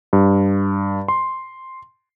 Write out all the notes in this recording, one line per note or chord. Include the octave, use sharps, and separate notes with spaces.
G2
C6